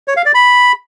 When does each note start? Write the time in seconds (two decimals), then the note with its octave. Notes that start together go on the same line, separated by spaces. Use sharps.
0.08 C#5
0.17 F5
0.26 D5
0.35 B5